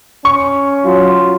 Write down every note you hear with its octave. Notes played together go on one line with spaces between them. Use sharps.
C#4 C#6
F#3 F4